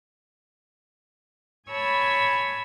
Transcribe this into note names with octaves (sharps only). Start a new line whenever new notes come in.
C#5 G#5 A5 B5 E6 G#6